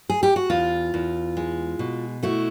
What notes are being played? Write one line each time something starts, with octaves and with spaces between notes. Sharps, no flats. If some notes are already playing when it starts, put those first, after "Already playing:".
G#4
G4
F#4
E2 F4
E2
G#3
B2
A3 E4 F#4